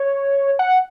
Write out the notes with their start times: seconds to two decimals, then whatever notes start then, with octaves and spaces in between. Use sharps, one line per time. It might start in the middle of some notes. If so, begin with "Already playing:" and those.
Already playing: C#5
0.59 F#5